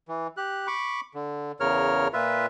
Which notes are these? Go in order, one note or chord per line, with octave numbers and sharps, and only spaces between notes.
E3
G4 F#6
B5 C#6 D6
D3
E2 C#3 A#4 C#5 F6
A#2 F4 B4 E5